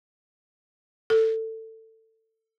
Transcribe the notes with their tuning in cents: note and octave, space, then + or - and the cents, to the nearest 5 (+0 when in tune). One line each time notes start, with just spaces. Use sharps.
A4 +20